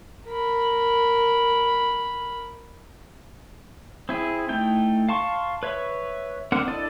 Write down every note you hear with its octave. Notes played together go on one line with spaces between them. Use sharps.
A#4 B5
C4 E4 G#4
A3 D#4 E4 G5
F5 A5 C6 C#6
B4 C#5 E5
C4 D4 A#4 F#5
D4 E4 A4 D5 D#5